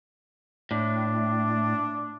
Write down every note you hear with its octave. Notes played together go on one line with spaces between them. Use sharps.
A2 D4